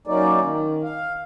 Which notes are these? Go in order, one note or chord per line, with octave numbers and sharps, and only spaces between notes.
F#3 A#3 C#4 D#4 D5
D#3
F5